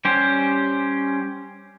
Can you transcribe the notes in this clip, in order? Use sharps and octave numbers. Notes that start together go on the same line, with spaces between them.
G3 C#4 G4 C5